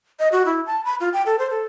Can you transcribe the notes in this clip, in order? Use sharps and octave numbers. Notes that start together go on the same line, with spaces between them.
D#5
F#4
E4
A5
B5
F4
G5
A4
C5
A4